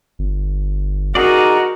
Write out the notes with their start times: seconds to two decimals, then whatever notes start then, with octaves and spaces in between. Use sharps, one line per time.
0.19 G1
1.15 D#4 F#4 G#4 A#4 D5